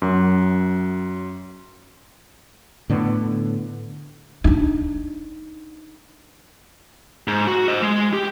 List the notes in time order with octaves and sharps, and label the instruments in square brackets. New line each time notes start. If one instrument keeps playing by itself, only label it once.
[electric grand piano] F#2 F#3
[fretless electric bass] A2 D3 B3
[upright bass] D4 D#4
[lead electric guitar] G#2
F#4
C5 D#5
G#3
G4